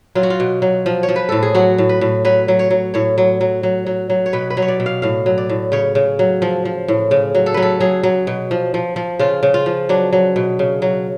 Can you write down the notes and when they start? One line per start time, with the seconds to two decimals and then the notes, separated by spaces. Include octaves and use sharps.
0.15 F#3 F4
0.23 F#4
0.30 F4
0.40 B2
0.62 F#3
0.86 F3
1.03 C#5
1.08 F3
1.16 B4
1.29 A2 A4
1.42 G#4
1.54 F#3 F#4
1.78 A2
1.89 B4
2.01 A2
2.25 F#3 B4
2.48 F#3
2.59 C#5
2.71 F#3
2.94 A2 C#5
3.18 F#3
3.41 F#3
3.63 F#3
3.86 F#3
4.10 F#3
4.26 C#5
4.33 B2 B4
4.50 B4
4.57 F#3
4.62 C#5
4.68 D5
4.80 B2
4.86 F5
5.02 A2 F5
5.26 F#3
5.38 D5
5.49 A2
5.72 C#3 C#5
5.95 C#3
6.19 F#3
6.42 F3
6.65 F3
6.88 A2
7.11 C#3
7.35 F#3
7.46 A4
7.54 F#3 B4
7.62 A4
7.80 F#3 G#4
8.03 F#3
8.27 B2
8.51 F3
8.74 F3
8.96 F3
9.19 C#3 F4
9.43 C#3
9.54 F4
9.66 F3
9.89 F#3 D4
10.13 F#3
10.36 B2
10.59 C#3
10.82 F#3